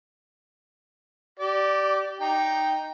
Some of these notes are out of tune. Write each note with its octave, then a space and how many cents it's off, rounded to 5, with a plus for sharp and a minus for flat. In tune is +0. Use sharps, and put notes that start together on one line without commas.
G4 -25 D5 +0
D#4 +0 G5 +0